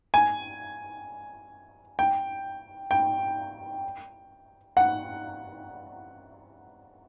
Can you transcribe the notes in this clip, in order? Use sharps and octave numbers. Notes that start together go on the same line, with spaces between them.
G#5
G5
G5
F#5